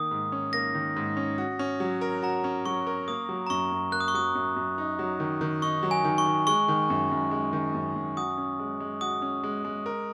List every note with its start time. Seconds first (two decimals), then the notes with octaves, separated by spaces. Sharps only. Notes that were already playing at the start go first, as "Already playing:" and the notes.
Already playing: D#3 A#3 D#6
0.11 G#2
0.32 C#4
0.53 A#3 A#6
0.75 D#3
0.96 G#2
1.17 C#4
1.38 F#4
1.59 C#4
1.80 F#3
2.01 A#4
2.22 F#4 A#5
2.44 C#4
2.66 F#3 C#6
2.87 A#4
3.08 A#3 D#6
3.29 F#3
3.47 A#5
3.50 F#2 C#6
3.72 F#2
3.92 A#3 F#6
4.00 D#6
4.08 C#6
4.14 F#3 D#6
4.35 F#2
4.56 F#2
4.78 D#4
4.99 F#3
5.20 D#3
5.41 D#3
5.62 D#4 C#6
5.83 F#3
5.91 G#5
6.05 D#3
6.18 C#6
6.26 D#3
6.47 G#3 C#6
6.68 D#3
6.90 F#2
7.11 F#2
7.31 G#3
7.53 D#3
7.74 F#2
7.96 F#2
8.17 F#4 D#6
8.38 C#4
8.59 G#3
8.80 G#3
9.01 F#4 D#6
9.22 C#4
9.44 G#3
9.65 G#3
9.86 A#4